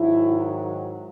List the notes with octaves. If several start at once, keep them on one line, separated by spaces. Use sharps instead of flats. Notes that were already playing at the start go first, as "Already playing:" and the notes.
Already playing: G#2 D#3 F#3 E4